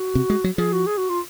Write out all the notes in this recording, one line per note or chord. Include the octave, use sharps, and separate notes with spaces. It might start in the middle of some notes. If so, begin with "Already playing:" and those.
Already playing: F#4
C3
G#3
F#3
F3 G#4
F#4
G#4
F#4
F4